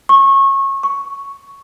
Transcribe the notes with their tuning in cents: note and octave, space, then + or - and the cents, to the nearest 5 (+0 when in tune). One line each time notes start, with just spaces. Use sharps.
C#6 -25
C#6 +0